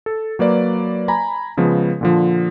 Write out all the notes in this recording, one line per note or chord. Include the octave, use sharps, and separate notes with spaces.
A4
F#3 A#3 B4 D5
G#5 A#5 B5
C#3 F3 G#3 B3
A#2 D3 F3